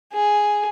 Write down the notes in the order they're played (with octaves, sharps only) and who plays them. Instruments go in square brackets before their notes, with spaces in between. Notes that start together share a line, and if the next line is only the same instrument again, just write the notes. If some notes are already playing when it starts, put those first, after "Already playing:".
[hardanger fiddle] G#4